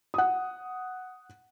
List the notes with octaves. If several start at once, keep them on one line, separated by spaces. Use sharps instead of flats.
F#5 D#6